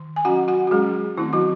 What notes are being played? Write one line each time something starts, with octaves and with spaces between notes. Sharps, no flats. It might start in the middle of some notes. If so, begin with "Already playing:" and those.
Already playing: D#3
G#5
F#3 C#4 F#4 F#5
F#4 F#5
F#4
F#3 G#3 C#4 G#4
D#3 A3 C4 E4
F#3 F#4